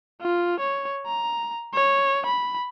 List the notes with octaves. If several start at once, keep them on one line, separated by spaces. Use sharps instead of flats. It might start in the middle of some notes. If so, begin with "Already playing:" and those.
F4
C#5
A#5
C#5
B5